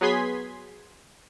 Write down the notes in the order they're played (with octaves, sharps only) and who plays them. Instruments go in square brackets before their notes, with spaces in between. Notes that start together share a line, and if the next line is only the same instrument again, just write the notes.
[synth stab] F#3 B3 G#4 C6 G#6 B6